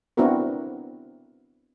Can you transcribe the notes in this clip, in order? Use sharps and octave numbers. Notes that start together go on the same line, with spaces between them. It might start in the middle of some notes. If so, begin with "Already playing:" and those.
B3 C4 D4 E4 F#4 A#4